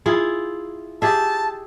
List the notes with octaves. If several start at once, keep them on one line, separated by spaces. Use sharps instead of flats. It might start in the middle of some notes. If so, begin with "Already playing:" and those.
E4 F4 G#4
G4 G#4 E5 A5